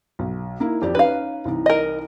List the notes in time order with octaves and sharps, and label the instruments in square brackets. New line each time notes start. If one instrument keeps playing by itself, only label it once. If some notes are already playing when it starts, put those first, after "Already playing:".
[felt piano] B1
A#3 D#4 E4
F2 G4 D5
[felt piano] C#4 D#4 [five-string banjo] B4 F5
[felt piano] C2 E3 D#4
[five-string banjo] A#4 D#5